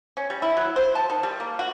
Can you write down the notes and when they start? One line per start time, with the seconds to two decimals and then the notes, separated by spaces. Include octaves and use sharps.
0.17 C#4
0.30 G3
0.42 E4
0.57 F#3
0.76 C5
0.95 A5
1.10 D#3
1.23 G3
1.40 A#3
1.59 F#4